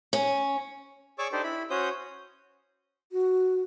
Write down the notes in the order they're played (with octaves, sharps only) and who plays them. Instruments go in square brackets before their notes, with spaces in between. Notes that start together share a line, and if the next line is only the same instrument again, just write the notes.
[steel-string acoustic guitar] C#4
[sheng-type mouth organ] G#4 C#5 D5 C#6 D6 E6
D4 D#4 G4 A4 C5 D5
E4 B5
C#4 F#4 C5 C#5 D#6 G6
[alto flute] F#4